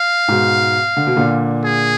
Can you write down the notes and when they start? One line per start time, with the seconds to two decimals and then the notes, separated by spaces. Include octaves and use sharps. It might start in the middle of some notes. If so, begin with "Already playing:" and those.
Already playing: F5
0.28 G#2 B2
0.97 D3
1.07 B2
1.16 A#2 D3
1.64 G#4